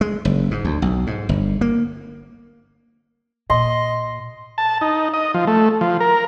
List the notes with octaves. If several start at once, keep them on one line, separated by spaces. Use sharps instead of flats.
G#3
F#1
G#2
D2
B1
G#2
G1
A#3
A#2 D#5 C6
A5
D#4
D#5
F3
A3
F3
A#4